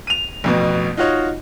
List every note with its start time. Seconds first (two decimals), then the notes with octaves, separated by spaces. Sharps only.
0.07 D#7 F7
0.44 A1 F2 B2
0.97 D#4 F4 F#4 C#5 D#5